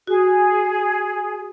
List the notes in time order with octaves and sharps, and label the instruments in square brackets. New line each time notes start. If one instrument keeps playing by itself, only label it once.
[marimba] F#4 [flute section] G#4